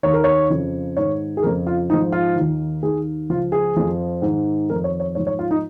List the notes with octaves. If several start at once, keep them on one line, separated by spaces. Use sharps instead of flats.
D#2 D#3 C#5
A#4
C#5
F2 C#3 F3
G#2 D#3 C#5
G#4
F2 C#3 F3 A#4
F4
G#2 F3 D#4
F4
D#2 D#3
D#2 D#3 G#4
C#2 C#3 F3 F4
G#4
F2 F3
G#2 D#3
F2 D#3 A#4
C#5
C#5
G#2 F3 C#5
C#5
F4
D#4